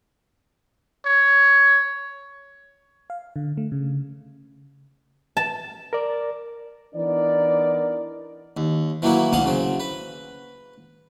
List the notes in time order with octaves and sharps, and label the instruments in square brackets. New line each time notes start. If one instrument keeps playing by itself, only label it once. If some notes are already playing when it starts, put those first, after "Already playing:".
[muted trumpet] C#5
[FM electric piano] F5
D3
A3
C#3
[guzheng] A5
[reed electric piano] A#4 D5
[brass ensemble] E3 B3 D4 D#4 A#4 D5
[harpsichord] D#2
E3 F#3 A3 A#3 E4 F#5
D2 B2 F5 F#5 A5 D#6
C#3 F#3 C4
B4